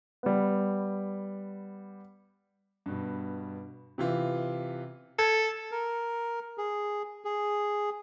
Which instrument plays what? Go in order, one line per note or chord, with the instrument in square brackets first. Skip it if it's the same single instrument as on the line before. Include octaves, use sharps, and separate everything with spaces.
[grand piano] G3 B3
G2 B2
C3 E3 F4
[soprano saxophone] A4 [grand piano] G#6
[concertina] A#4
G#4
G#4